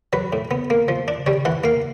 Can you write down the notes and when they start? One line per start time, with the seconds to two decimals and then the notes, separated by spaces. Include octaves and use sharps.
0.13 F#3 B4
0.33 A2
0.51 B3
0.70 A#3
0.88 F3
1.08 D4
1.26 G3 C#5
1.45 E3 F#5
1.64 A#3 F5